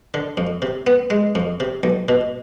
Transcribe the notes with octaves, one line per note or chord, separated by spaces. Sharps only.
D3
F2
C3
B3
G#3
F2
C3
B1
B2